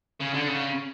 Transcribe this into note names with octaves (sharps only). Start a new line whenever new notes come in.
C#3
D3
C#3